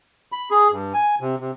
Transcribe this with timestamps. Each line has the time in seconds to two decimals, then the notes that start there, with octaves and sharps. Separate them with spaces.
0.32 B5
0.51 G#4
0.71 G2
0.94 G#5
1.21 C3
1.40 C3